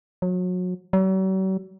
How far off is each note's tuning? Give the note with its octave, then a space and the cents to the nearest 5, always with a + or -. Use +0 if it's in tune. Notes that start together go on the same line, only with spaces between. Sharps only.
F#3 -30
F#3 +45